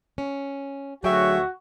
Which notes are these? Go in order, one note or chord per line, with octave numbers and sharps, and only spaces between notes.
C#4
D2 F#3 F#4 G#4 C#5 E5 G5